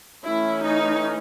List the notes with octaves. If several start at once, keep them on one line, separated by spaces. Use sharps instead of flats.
E3 A3 C#4 E4
D#4